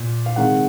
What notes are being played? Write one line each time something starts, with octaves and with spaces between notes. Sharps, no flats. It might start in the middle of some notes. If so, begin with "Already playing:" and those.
Already playing: A#2
F5
C3 D#3 G#3 F#5